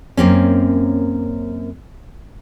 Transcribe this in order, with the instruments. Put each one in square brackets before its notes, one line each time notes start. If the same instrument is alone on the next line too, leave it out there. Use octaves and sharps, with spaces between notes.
[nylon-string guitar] F#2 A#3 C4 C#4